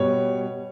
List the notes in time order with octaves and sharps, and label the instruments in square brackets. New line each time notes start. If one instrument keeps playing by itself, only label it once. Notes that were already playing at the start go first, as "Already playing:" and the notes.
Already playing: [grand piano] B2 G3 C#5